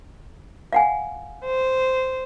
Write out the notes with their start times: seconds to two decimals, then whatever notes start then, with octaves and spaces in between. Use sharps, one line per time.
0.73 F5 F#5 G#5
1.45 C5